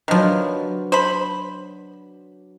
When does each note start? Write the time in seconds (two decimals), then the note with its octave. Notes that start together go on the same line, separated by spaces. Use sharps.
0.08 D#3 F3 F#3 D4 B4
0.92 C5 B5